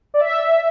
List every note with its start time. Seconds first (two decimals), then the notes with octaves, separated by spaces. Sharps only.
0.14 D5
0.20 E5